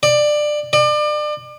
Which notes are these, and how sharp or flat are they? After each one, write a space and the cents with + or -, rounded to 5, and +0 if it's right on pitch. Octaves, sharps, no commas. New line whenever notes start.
D5 +20
D5 +35